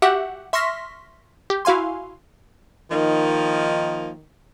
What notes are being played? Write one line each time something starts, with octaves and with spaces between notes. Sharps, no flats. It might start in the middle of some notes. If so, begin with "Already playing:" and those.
F#4 G4 E5 F#5
E5 C6 C#6 F6 A#6 B6
G4
E4 F#4 F5 G#5 C6
D#3 F3 A#3 D#4